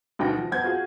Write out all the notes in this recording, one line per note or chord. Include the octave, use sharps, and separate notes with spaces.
D2 B2 D#4 G5 A#6
F3
F2 B3 C4 G6 G#6
F4 F#4 G#4